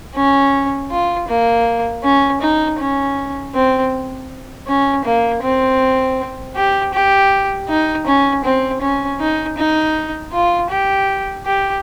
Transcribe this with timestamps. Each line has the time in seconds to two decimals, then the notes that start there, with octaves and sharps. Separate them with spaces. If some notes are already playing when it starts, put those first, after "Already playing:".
0.15 C#4
0.90 F4
1.28 A#3
2.03 C#4
2.41 D#4
2.79 C#4
3.55 C4
4.67 C#4
5.05 A#3
5.43 C4
6.55 G4
6.94 G4
7.69 D#4
8.06 C#4
8.44 C4
8.81 C#4
9.20 D#4
9.57 D#4
10.33 F4
10.70 G4
11.46 G4